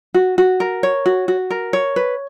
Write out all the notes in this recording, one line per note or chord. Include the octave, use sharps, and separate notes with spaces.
F#4
F#4
A#4
C#5
F#4
F#4
A#4
C#5
B4